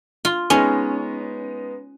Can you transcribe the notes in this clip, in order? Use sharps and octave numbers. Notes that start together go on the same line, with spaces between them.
F4
G#3 B3 C#4 D#4